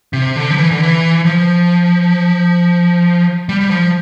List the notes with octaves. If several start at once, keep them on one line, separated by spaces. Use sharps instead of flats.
C3
D3
F3
E3
D3
E3
F3
G3
G3
F3